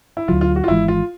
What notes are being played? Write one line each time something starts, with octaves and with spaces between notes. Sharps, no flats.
E4
D2 D3 F#3 F4
F4
F#4
F4
G#1 G#2 E3 G#3 E4
F4